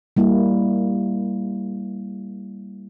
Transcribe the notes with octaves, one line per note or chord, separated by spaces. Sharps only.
G3 A#3 E4